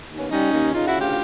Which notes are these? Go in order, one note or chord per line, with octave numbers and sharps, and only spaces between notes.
D#2
B3 C#4
G3 C#4 D#4
D#2
C#3 D#4 F4
E4 F#4
D2
F4 G4